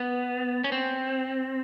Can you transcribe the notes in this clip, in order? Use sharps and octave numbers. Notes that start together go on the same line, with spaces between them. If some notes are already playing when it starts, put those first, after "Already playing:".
Already playing: B3
C#4
C4